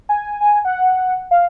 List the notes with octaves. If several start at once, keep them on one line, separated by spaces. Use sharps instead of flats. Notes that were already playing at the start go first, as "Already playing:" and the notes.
G#5
G#5
F#5
F5